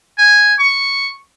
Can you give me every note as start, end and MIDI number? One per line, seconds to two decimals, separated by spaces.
0.18 0.54 80
0.59 1.16 85